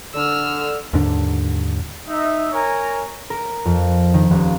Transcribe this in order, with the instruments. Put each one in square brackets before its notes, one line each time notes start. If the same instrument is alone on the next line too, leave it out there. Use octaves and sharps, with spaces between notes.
[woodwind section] D3 [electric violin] E6 F6
[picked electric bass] D#2 G#2 D3 D4
[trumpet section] D#4 E5
A#4 C#5 G#5 A#5
[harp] A#4
F2
D#3
D#1